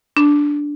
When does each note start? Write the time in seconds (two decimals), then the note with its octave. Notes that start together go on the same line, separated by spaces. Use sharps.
0.17 D4